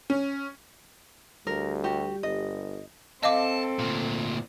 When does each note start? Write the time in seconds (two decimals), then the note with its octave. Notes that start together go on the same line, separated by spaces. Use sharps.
0.10 C#4
1.47 D2 G3 A#4
1.84 F#4 G4
2.23 G1 D#5
3.23 C4 A4 D#5 F5 A5 D6
3.79 D2 A#2